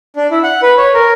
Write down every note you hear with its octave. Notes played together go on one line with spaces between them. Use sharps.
D4
E4
F#5
B4
C#5
A#4